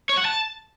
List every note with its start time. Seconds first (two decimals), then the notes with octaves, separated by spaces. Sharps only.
0.09 C#5
0.17 F#5
0.25 A5